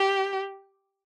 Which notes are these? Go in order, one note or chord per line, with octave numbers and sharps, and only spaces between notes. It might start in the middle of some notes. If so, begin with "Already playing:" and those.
Already playing: G4